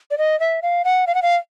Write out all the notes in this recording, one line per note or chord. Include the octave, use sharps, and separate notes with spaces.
D5
D#5
E5
F5
F#5
F5
F#5
F5